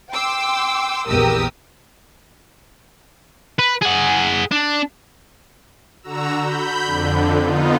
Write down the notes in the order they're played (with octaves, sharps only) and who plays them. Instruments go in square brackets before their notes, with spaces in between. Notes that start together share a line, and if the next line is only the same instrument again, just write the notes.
[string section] G5 C6 D6 E6
A#1 E2 G4 A#4 D#6 E6
[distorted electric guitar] B4
G#4 F#5
D4
[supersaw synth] D3 F#4 A#5 E6
B5 G6
F2 D3
B3 D#4 F4